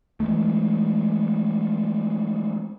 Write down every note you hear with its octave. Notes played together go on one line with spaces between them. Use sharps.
E3 F3 G#3 A3